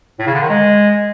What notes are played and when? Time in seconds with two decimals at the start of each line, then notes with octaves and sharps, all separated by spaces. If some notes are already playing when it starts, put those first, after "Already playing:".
0.19 A2
0.27 C#3
0.34 D3
0.42 D#3
0.49 G#3